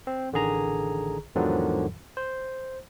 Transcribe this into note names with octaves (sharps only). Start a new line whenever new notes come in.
C4
A1 D3 D#3 G#4 A#5
E2 G#2 D3 D#3 F3 F#3
C5